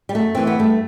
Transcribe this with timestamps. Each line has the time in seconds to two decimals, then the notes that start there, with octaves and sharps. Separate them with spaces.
0.09 G3
0.15 F#2 A3
0.35 E3 C4
0.47 B3
0.59 G2 A3